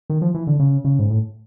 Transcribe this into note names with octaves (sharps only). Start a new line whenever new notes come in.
D#3
F3
E3
D3
C#3
C#3
G#2
A2